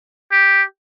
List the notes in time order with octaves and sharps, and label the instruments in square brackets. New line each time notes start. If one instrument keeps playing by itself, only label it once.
[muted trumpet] G4